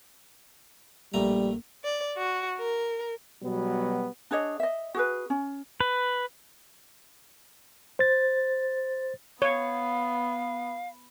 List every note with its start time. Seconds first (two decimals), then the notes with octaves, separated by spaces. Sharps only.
1.14 A#1 G3 A3 A#5
1.84 D5
2.16 F#4
2.58 A#4
3.43 B2 F#3 G3 B3
4.31 D4 G#4 C#5 D#5
4.60 D#5 E5
4.95 F#4 G#4 B4
5.30 C#4
5.80 B4
7.99 C5 A6
9.42 B3 C#5 F5